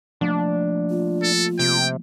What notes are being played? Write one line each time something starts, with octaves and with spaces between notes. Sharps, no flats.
F3 A3 A#3 D4
F4
A4
C3 G5